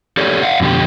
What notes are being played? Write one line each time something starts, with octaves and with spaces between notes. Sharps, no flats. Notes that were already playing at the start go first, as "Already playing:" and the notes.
G4 A4 C#5 D5
D#5 F5 F#5
F2 B2 D3 G4